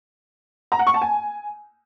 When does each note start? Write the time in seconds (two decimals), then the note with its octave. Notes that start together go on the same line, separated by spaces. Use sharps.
0.72 A#5
0.79 F#5
0.87 C#6
0.94 A5
1.02 G#5